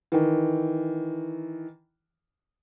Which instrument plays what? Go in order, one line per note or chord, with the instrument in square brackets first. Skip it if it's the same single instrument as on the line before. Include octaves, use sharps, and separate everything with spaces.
[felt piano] D#3 E3